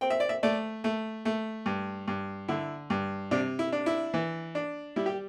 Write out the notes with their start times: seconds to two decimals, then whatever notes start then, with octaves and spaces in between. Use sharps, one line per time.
0.01 C4 G5
0.10 E5
0.20 D5
0.29 E5
0.43 A3 D5
0.84 A3
1.25 A3
1.66 G2
2.08 G2
2.48 D3 E4
2.90 G2
3.31 C3 D4
3.59 E4
3.72 D4
3.86 E4
4.14 E3
4.55 D4
4.96 G3 E4
5.06 G4